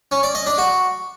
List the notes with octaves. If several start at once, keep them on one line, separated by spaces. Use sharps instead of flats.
C#4
D5
D#5
D4
F#4